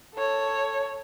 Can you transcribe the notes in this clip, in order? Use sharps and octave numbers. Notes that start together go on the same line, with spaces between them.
A4 C#5